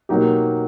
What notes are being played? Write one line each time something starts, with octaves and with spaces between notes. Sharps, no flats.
B2 F#3 A#3 D#4 G4